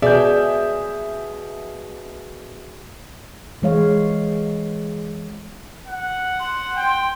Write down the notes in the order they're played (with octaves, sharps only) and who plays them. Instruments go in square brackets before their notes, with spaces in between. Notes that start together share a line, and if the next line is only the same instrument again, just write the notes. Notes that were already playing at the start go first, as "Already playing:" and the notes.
[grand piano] B2 [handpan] G#4 [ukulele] D5 [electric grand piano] E5 G6
[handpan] E3 G#3 C#5 F5
[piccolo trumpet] F#5
[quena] C6
[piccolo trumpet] G5